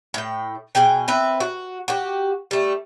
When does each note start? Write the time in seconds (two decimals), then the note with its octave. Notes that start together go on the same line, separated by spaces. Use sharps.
0.14 A2 G5
0.75 B2 G#4 G5 G#5
1.08 C4 B4 E5
1.40 F#4
1.88 F#4 G4
2.51 G3 A3